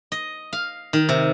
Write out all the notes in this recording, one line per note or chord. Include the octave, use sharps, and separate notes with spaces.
D#5
F5
D#3
C3